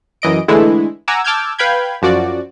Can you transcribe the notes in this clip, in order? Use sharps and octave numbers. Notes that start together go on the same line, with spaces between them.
F#2 E3 D#5 D7
D3 E3 G#3 A3 E4
F#5 G#5 A#5 D6 E6
A5 D6 E6 F6 G6 G#6
B4 F5 G5 B5 G6 G#6
F#2 F3 F#4 D5